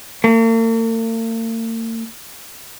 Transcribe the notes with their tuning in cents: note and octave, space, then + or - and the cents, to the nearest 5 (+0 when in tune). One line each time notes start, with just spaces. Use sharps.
A#3 -45